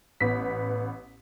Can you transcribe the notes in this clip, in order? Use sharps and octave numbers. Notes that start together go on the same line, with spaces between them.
A1 B3 B6